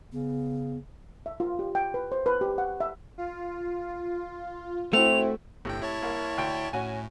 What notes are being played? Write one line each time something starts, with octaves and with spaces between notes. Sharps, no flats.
C#3 B3
E5
F4
G4
G5
B4
C5
B4
G4
F#5
E5
F4
A3 C4 E4 F#4 F7
G1 A2 C3 G5
E4 C#5 A5
C2 A#3
D2 G5
A2 C#4 F#4 G#5